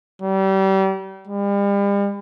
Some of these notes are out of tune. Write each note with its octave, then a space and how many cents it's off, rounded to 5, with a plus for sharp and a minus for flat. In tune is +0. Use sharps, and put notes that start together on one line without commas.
G3 -30
G3 +40